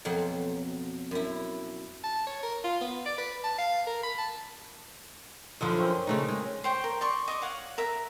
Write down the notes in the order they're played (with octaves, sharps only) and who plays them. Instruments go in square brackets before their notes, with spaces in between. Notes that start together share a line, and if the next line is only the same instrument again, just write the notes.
[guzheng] F2 B2 F#3
F#2 E4
[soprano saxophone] A5
C#5
A#4
F4
B3
D5
B4
A5
F5
A#4
B5
A5
[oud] F#2 D3 F3 [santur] D#4 B4
[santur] C4 C#4 A#4
[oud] C#3 A3 D#4
[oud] G#3 [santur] C#5
[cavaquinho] C5 G5 C#6
A#4
D5 C6 C#6
D#5 C#6 D6
C#5 F5 F#5
A#4 E5